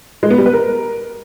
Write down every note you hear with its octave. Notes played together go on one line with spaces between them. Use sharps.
G#3
B3
G3
B4
A#4